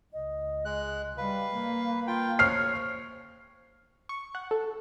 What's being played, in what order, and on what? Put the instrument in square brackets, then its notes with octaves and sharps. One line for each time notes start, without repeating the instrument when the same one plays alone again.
[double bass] C#2 [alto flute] D#5
[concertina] G#3 F#6
[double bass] G3 [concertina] B4 [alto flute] F5
[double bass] A#3
[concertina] F4 G5
[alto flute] C5 [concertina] C#5 [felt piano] F6 C7
[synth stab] C#6
F#5
A4